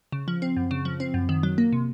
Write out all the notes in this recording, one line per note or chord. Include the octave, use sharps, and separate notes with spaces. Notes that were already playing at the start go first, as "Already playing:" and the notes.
C#3
F3
C4
F#2
C#3
F3
C4
F#2
D#3
F#3
A#3
C3